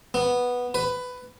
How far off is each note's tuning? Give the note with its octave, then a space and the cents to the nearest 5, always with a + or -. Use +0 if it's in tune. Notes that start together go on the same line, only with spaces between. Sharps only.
B3 -5
B4 +15